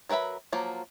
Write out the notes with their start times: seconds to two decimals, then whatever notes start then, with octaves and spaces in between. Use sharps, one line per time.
0.09 F#3 A#4 B4 E5 B5
0.52 F3 F#3 A#3